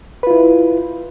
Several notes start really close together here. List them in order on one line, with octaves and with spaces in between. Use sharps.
B4 F4 E4